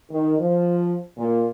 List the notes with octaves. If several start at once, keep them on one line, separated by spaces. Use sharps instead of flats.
D#3
F3
A#2